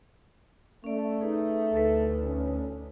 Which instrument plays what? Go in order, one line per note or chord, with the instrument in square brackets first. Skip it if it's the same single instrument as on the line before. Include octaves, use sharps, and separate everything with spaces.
[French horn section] A3 [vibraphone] C#4 D5
[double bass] D#4 [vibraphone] G#4 B4
[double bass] D2 [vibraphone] D#4 A4 B4
[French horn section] C#4